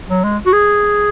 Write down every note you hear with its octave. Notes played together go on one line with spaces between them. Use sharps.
F#3
G#3
F#4
G#4